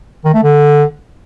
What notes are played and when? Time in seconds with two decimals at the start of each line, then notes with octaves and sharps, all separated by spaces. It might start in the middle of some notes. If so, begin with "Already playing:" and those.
0.25 D#3
0.34 A3
0.43 D3